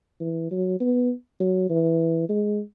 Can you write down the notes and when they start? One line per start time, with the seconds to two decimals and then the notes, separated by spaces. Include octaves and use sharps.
0.21 E3
0.51 F#3
0.80 B3
1.40 F#3
1.70 E3
2.29 G#3